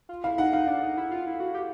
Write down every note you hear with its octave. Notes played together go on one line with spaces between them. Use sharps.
F4
E4 F5
D#4 F#5
D#4 F5
D4
D#4
E4
F4
E4
F#4
G4